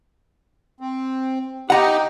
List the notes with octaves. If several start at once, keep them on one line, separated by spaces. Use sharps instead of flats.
C4
D#4 G4 F#5 A#5